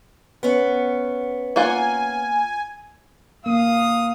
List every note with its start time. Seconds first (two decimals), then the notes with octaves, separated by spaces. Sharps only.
0.43 B3 C#4
1.56 A#3 F4 F#5 G#5
3.46 A#3 F5 D#6